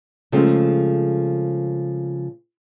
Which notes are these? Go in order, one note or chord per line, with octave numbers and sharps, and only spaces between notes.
C#3 F3 G#3 A3 C4